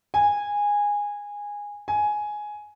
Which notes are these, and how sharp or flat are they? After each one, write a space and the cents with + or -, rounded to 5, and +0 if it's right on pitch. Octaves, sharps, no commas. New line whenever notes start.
G#5 -15
G#5 +10